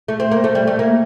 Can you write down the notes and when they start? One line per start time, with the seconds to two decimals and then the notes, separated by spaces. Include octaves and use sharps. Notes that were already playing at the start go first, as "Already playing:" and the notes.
0.08 A3
0.20 C4
0.31 A#3
0.44 A3
0.55 G3
0.67 A3
0.79 A#3